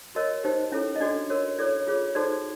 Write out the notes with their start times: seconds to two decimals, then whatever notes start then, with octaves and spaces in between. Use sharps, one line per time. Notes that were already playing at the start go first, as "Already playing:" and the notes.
0.15 F#4 A#4 C#5 D#5
0.44 D#4 G4 C5
0.72 C#4 E4 A4 C#5
0.96 D#5
1.01 D4 F#4 A4 D5
1.30 F#4 A#4 C#5
1.58 E4 A4 C#5 D5
1.87 F4 G#4 C#5
2.15 D#4 F#4 A4 C5 D5